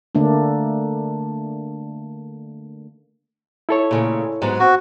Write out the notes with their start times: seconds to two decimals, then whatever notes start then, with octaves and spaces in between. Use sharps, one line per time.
0.15 D3 A3 A#3 D4
3.69 E4 A4 C#5
3.91 A#2 C#3 A3
4.42 G#2 F#3 B3
4.60 C4 F#4